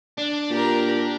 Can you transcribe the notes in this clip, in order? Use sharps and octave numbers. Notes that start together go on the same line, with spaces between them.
D4
A#2 G4 A#4